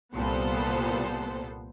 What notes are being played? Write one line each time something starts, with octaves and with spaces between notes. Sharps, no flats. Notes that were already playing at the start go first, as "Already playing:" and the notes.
C2 A#2 B3 A4 C5